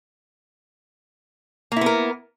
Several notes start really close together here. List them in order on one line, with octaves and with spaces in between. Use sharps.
A#3 E4 B3 A#4